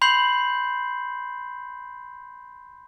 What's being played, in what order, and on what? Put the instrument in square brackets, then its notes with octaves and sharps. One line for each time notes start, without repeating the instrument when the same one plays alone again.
[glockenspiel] B5 C6 G6 C7 F#7